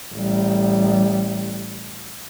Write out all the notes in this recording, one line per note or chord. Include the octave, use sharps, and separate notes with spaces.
A1 G3